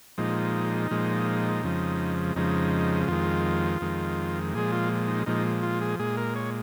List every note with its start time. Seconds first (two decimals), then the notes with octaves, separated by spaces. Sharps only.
0.18 A#2 F3 G#3 D#4
0.91 A#2 F3 G#3
1.63 F2 C#3 F3 G#3
2.36 F2 C#3 F3 G#3 D#4
3.08 F2 D#3 G#3 F4
3.81 F2 D#3 G#3
4.54 A#2 F3 G#3 G#4
4.72 F4
5.08 D#4
5.26 A#2 F3 G#3 D#4
5.63 F4
5.81 G#4
5.99 A#2 G#3 G#4
6.17 A#4
6.36 C#5